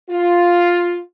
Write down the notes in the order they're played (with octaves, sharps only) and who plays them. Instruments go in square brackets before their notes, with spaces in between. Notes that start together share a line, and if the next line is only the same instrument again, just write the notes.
[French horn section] F4